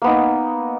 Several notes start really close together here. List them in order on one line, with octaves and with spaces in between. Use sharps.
A#3 B3 D#4